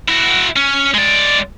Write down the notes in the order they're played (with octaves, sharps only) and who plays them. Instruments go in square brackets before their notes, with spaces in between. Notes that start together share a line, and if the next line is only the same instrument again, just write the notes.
[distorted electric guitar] E4 F#4
C#4
G#3 D5